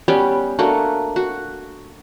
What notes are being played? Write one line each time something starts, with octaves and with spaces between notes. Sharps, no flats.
G3 B3 C#4 G4
A3 A#3 D4 F#4
F#4